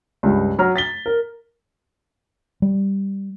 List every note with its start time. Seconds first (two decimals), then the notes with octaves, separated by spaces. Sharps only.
0.23 C#2 G2
0.59 F#3 A#5 F6
0.76 A6 B6 G7
1.06 A#4
2.62 G3